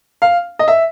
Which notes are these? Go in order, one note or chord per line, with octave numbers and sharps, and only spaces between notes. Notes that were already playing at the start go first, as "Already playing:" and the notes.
F5
D#5
E5